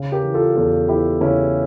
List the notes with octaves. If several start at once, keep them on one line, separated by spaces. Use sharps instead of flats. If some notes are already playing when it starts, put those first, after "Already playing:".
Already playing: C#3
G4 A#4
E3
F4 A4
E2 F4 A4
E3 E4 G4
C#3 C#4 E4